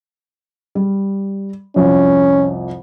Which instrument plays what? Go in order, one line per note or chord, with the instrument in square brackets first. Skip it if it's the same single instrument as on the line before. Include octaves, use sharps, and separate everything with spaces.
[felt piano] G3
[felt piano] C2 F2 [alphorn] C#4